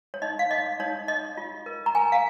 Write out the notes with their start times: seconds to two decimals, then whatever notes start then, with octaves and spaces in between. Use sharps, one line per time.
0.14 C#5
0.22 D#4 D#5
0.39 F5
0.51 C#5 D#5
0.79 D#4 C#5
1.08 C#5 D#5
1.37 F4
1.66 A#4
1.86 A#5
1.95 A#4 G#5
2.12 F5